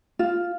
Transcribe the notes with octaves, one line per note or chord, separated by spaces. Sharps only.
F4